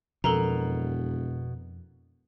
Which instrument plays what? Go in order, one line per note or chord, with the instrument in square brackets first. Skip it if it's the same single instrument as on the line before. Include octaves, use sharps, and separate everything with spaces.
[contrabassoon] E1 [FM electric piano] F2 [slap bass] B2 [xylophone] A4 A#4 A#5